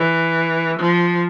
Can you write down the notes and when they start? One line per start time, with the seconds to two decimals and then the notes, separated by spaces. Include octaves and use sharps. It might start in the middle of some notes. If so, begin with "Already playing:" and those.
Already playing: E3
0.79 F3